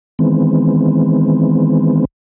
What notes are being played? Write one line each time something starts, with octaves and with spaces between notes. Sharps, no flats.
D#3 E3 G#3 B3 C4